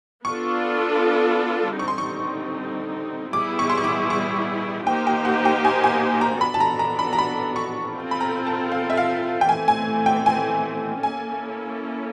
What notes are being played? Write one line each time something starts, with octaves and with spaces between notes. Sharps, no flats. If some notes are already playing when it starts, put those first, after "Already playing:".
B3 D4 F4 A4 C#6
D3 G3 C4 D#4 C#6
C6
C#6
G3 B3 E4 G#4 D6
C#6
C6
C#6
D6
C#6
A#3 D#4 G4 C5 G5
G5
F#5
G5
G#5
G#5
A#5
B3 D4 F#4 A4 B5
A5
A#5
A#5
B5
A#5
B5
C#6
C4 F4 A4
B5
A#5
A5
F5
E5
F5
G5
E3 A3 C4 G#5
G#5
G5
G#5
A#3 C#4 E4 A4 G#5